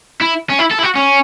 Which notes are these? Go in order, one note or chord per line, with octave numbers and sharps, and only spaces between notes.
E4
C#4
E4
A4
E4
F#4
C#4